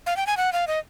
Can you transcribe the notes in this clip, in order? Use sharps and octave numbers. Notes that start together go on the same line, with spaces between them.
F5
G5
G#5
F#5
F5
D#5